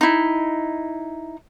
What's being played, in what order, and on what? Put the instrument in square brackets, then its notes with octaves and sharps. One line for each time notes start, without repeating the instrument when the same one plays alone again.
[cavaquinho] D#4 E4